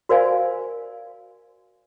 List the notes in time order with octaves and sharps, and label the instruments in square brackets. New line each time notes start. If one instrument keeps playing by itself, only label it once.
[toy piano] F#4 A#4 C5 D5 F5 G#5